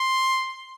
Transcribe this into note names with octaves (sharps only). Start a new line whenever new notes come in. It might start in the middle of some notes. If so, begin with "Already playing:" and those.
Already playing: C6